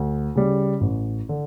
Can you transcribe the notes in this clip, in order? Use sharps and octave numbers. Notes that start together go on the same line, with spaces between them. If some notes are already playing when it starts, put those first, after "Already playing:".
Already playing: D2
C#3 G3
A1
D3